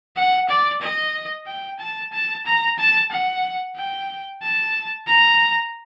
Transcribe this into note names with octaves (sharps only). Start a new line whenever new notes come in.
F#5
D5
D#5
G5
A5
A5
A#5
A5
F#5
G5
A5
A#5